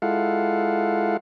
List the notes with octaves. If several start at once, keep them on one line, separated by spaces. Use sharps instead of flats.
G#3 E4 F4 A4 F5 F#5